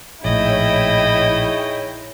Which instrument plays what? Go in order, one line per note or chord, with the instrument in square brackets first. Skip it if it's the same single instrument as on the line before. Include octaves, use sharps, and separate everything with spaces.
[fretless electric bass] A#1 A2 [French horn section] D#4 G#4 C#5 [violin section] E4 G5 [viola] D#5